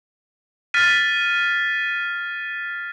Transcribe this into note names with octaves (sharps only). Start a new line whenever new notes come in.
F6 A6 B6 D#7